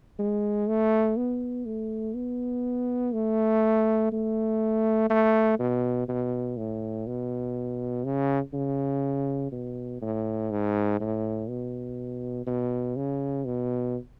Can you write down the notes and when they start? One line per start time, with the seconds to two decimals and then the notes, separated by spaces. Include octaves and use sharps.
0.19 G#3
0.68 A3
1.17 B3
1.65 A3
2.15 B3
3.14 A3
4.12 A3
5.10 A3
5.59 B2
6.08 B2
6.57 A2
7.07 B2
8.05 C#3
8.53 C#3
9.52 B2
10.02 A2
10.51 G#2
11.00 A2
11.49 B2
12.47 B2
12.96 C#3
13.45 B2